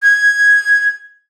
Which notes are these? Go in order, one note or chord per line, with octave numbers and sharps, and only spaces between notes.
G#6